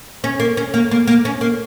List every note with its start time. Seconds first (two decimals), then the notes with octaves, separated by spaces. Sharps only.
0.24 C#4
0.40 A#3
0.57 C#4
0.74 A#3
0.91 A#3
1.07 A#3
1.25 C#4
1.41 A#3